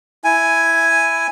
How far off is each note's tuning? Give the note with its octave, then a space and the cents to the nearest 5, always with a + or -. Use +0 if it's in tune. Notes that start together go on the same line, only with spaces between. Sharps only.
E4 +0 G#5 +0